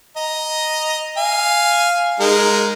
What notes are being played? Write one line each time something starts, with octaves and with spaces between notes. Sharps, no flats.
D#5 A#5
F5 G#5
G#3 D#4 A#4